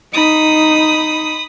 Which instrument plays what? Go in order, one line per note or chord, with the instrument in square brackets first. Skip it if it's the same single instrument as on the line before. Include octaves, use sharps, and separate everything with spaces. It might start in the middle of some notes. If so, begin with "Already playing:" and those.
[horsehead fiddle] D#4 [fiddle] B5 D#6